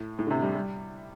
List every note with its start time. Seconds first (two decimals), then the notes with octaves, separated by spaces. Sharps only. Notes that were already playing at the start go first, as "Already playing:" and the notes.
Already playing: A2
0.19 A2
0.27 D3
0.31 C3
0.42 G3
0.55 G3